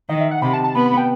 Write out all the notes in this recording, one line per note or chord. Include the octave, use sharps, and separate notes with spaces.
D#3 D#5
E5
F#5
C3 B5
A5
A5
B3 B5
B5
G5